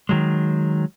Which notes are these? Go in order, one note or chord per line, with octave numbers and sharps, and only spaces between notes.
D#3 F#3 G#3